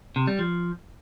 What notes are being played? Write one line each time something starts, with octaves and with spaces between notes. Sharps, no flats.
C3
G3
F3